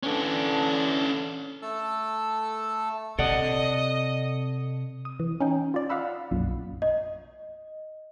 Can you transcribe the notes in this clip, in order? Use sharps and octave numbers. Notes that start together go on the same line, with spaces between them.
D3 E3 C#4 D4 A4
A3 A4 A5 E6
C3 A4 D5 D#5 F#5
D#6
E3
C#4 D#4 G5
F4 D5
D#5 F5 F#5 B5 E6
B1 F#2 A#2
D#5